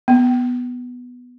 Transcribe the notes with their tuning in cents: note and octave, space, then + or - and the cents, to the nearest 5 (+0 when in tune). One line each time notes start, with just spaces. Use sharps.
B3 +0